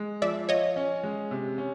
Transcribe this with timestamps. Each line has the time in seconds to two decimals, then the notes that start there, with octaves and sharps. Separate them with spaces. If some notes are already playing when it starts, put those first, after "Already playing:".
Already playing: G#3
0.22 F3 D5 E5
0.49 F4 C#5 D#5
0.76 C#4
1.03 G#3
1.31 C3
1.58 C#4